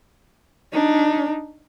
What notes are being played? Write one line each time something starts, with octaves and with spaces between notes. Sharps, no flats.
D4 D#4